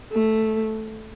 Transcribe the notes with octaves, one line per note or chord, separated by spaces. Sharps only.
A3